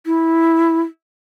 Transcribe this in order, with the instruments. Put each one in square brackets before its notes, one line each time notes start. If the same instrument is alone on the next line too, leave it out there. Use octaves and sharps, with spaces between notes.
[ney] E4